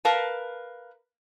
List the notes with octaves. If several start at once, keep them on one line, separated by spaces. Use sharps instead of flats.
A#4 B4 F5 A5